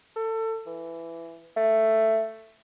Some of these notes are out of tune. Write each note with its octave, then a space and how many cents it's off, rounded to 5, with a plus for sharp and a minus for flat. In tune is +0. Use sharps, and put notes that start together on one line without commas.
A4 +25
E3 +15
A3 +10